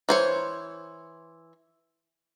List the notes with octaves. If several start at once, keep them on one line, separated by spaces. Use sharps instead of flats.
E3 C5 C#5